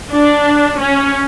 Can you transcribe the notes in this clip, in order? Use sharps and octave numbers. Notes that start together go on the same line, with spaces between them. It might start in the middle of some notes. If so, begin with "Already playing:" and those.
D4
C#4